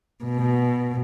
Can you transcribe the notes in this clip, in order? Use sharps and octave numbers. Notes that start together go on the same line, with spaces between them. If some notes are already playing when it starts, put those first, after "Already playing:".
B2